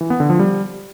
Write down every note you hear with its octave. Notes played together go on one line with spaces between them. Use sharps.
E3
B3
D3
F3
G3